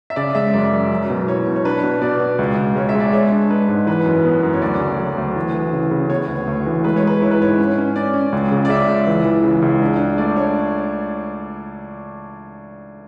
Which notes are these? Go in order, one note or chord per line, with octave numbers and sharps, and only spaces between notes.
E5
C#3 D5
G#3 E5
F#2 D5
F#2
F#3
B2
E4 C#5
B2
C#5
D4 B4
B2
B2 D5
B2
C#2
C#2
G#3 C#5
E5
G#3
D5
G#3 C#5
D4
G#3 B4
G#2
E3 B4
F#2
B3
F#2
C#5
D2 D5
C#3
F#3
D2
E3
E3
C#3
C#3
B3 C#5
D2
D2
E3
G#3 B4
C#5
G#3 B4
E4 C#5
B4
G#2 C#5
C#4
C#4
C#4 D5
C#4
C#2
C#3
D5
C#3 E5
C#2
E3
E3
C#3
C#2
D4
D4
A3 D5
D4 C#5